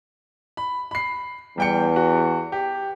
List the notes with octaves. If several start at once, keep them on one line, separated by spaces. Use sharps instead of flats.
B5
B5 C7
E2 G3 G5 C#7
F#4
G4